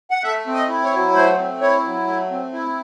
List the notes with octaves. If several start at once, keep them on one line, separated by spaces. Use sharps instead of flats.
F#5
A3 E5
C4
D#5
E4
C#5
F#3
A3 C5
C4
E4 C#5
F#3
A3
C4
E4